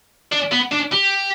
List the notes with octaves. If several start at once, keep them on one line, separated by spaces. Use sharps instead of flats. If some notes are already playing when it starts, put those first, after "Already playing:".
D4
B3
D4
G4